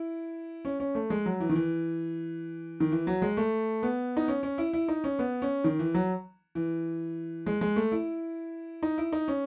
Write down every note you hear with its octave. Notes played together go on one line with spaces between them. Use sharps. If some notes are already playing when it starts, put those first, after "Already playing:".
Already playing: E4
C#4
C#4
A3
G#3
F#3
E3
D#3
E3
D#3
E3
F#3
G#3
A3
B3
D#4
C#4
C#4
E4
E4
D#4
C#4
B3
C#4
D#3
E3
F#3
E3
G#3
G#3
A3
E4
D#4
E4
D#4
C#4